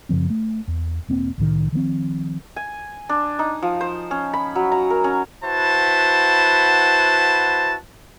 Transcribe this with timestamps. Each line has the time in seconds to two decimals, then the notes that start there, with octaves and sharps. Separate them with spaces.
0.09 F#2 C#3 F3 C4
0.30 A3
0.68 E2
1.08 E1 A#3 C4
1.38 C2 A2 D#3
1.72 D#3 F3 A3 C4
2.56 G#5
3.09 D4
3.39 D#4
3.62 F3
3.81 C5
4.11 C#4
4.34 B5
4.55 F#3
4.72 A#5
4.90 A#4
5.04 C#4
5.45 E4 F#4 B4 C5 F#5 A5